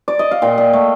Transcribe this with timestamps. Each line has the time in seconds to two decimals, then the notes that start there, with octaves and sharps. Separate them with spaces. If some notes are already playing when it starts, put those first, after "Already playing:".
0.08 D5
0.19 D#5
0.31 F5
0.42 A#2 G5
0.58 A#2
0.73 A3